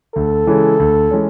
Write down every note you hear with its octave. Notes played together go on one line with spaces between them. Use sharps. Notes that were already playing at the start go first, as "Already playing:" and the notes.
D2 A4
C#3 E3 G#3 C#4
D2
E3 G#3 C#4